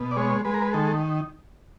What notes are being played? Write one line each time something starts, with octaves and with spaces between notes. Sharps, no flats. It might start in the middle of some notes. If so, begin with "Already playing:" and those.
Already playing: B2
D5
G#3 C#5
G#3 B4
A#4
B4
D#3 A4